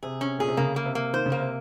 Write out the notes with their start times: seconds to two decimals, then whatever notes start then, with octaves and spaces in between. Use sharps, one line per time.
0.03 C3 G#4
0.21 C#4
0.38 A#2 G#4
0.48 C3
0.57 C#3 A#3
0.76 A#3
0.85 C3
0.95 A#3
1.14 D#3 C5
1.26 C#3
1.32 A#3
1.40 C3